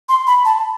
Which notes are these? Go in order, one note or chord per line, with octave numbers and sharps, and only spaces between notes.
C6
B5
A5